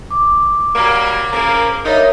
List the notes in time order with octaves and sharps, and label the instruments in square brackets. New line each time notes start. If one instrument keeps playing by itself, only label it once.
[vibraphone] D6
[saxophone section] F#3 G3 A#3
C#3 F3 A#3
[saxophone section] G2 D#4 [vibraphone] A#4 C#5 E5